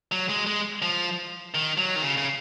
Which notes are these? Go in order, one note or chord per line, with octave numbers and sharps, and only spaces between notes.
F#3
G#3
G#3
F3
D#3
F#3
D#3
C#3
C#3